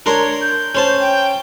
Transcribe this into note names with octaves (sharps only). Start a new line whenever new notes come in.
D4 A#4 C#5 C6
G6
C#4 C5 A5
G5